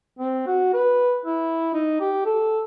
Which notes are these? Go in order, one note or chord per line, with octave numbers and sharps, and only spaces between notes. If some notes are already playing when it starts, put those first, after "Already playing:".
C4
F#4
B4
E4
D#4
G4
A4